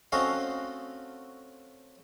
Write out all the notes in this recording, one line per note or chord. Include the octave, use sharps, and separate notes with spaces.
A3 C4 C#4 F#4 D#5 F5